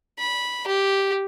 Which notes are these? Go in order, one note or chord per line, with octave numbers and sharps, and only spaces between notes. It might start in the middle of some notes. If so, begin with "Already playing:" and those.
B5
G4